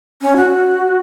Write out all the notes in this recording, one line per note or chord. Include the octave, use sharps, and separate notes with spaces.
C#4
F#4